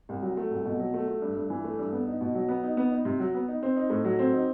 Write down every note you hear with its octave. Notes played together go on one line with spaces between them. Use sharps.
C2
F#3
A3
C2
B2
F#3
A3
A3
G2
G2
E3
A3
G2
B3
D#4
B2
F#3
B3
D#4
B3
D#4
C3
F#3
B3
D#4
C4
D#4
A2
F#3
C4
D#4